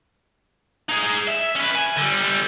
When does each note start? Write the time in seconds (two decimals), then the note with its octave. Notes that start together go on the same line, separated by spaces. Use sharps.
0.89 D#4 G#4
1.28 E5
1.56 C#4 B4
1.75 G#5
1.97 D3 G3